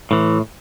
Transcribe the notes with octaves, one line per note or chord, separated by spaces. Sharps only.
A2 E3